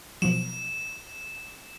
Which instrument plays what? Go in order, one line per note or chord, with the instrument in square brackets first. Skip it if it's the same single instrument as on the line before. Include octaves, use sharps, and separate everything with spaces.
[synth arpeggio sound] B2 F3 F#3 [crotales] E7